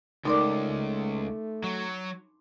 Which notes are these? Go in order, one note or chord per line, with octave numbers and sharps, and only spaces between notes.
C#2 A3 D#4 A#4 D5 C6 D6
F#3